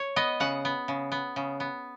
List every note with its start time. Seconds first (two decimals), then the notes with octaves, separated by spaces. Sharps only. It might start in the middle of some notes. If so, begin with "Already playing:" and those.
Already playing: C#5
0.16 B3 D#5
0.40 C#3 F#5
0.65 B3
0.88 C#3
1.12 B3
1.36 C#3
1.60 B3